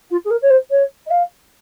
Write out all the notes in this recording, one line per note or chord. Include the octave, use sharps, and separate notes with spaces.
F4
G#4
A#4
C#5
C5
C#5
D#5
F5